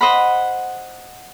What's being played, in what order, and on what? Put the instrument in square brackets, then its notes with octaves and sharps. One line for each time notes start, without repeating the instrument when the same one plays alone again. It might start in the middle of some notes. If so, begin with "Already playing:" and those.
[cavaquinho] C5 D#5 F#5 B5